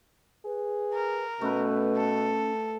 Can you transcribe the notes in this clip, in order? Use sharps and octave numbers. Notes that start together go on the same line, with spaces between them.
G#4 B4
A#4
B2 A3 C#4 B4
A4